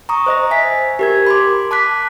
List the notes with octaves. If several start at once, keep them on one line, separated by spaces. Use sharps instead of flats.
A#5 C#6 D#6
C5 D#5 A#6
E5 G#5 B6
G4 A#4 G#6
B5 C6 D6
A5 D6 F#6 B6